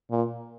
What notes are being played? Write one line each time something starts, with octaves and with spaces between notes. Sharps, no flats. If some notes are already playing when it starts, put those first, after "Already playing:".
A#2